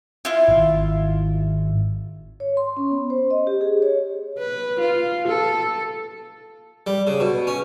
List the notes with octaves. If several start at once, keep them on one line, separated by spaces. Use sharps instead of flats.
E4 F4
G#1
C#5
C6
C#4
B3
C5
D#5
G4
G#4
C#5
B4
F4
A4
G3
C#3
B2
C#4